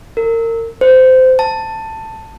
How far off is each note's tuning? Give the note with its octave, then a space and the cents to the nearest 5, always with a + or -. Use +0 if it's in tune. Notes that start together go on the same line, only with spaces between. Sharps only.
A#4 -30
C5 -20
A5 +15